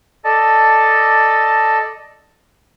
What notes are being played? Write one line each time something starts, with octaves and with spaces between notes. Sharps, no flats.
A4 D5 D#5 A5